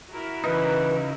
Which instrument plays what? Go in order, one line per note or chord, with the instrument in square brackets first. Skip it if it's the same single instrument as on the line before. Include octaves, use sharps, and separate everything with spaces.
[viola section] E4 F#4 A#4
[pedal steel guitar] C#3 D#4 [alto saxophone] E3 [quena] B4